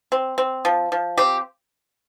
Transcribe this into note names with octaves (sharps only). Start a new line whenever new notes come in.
C4
C4
F3
F3
C4 G4